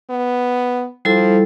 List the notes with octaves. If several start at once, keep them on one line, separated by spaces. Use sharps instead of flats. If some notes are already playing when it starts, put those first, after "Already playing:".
B3
F3 G3 E4 A4